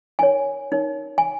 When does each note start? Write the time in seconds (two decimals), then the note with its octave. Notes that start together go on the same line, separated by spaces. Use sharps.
0.19 D#4 A#4 C#5 G#5
0.72 D#4 A#4 C#5
1.18 G#5